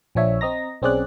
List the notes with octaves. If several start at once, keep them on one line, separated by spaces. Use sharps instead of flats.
A#1 F3 D4 C#5 E5
C4 D#5 A#5 A#6
B1 C4 C#4 G#4 D5 F#6